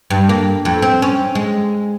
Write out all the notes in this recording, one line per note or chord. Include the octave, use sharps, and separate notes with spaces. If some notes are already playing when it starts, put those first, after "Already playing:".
G2
A#3
F2
C4
C#4
G#3